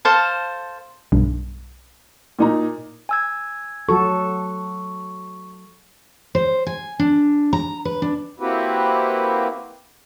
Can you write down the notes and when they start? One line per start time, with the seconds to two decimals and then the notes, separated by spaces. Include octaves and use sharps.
0.05 A4 C5 F5 A5
1.12 B1 G2
2.39 A#2 D#4 A#5
3.09 G#5 E6 G#6
3.89 F#3 F#4 A4 C#6
6.35 C5
6.67 G#5
6.99 D4
7.53 A#5
7.85 B4
8.02 D4
8.40 A#3 C4 E4 F#4 G4 B4